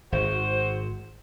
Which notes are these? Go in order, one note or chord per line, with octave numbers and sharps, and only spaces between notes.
G#1 F#4 C5